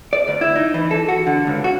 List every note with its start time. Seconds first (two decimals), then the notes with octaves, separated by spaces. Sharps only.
0.13 D5
0.28 D2
0.41 E4
0.56 D#4
0.74 E3
0.91 A4
1.08 F#4
1.27 D3
1.47 C#2
1.64 F#4